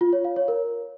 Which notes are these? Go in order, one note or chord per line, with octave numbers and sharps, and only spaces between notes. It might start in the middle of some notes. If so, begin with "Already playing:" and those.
F4
C#5
F5
C#5
A#4